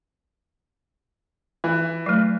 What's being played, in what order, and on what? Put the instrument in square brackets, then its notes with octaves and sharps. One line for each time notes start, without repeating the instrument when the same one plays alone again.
[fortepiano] E3
[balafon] F#3 A3